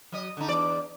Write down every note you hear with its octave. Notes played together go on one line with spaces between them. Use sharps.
F#3 D#5
D3 D#4
E2 D5